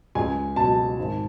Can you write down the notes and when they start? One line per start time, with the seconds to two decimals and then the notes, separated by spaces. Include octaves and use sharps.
0.15 C#2 G#5
0.56 B2 F#3 A5
0.98 G#1